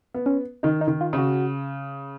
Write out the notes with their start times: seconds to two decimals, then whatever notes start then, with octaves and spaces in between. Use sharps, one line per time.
0.14 B3
0.26 C#4
0.63 D#3 D#4
0.81 D#4
0.88 D#3
1.01 F4
1.13 C#3 F#4